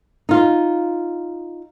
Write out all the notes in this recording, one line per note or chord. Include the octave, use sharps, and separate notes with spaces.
D#4 F4